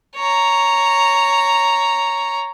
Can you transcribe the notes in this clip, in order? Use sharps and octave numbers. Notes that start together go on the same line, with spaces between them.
C#5 A#5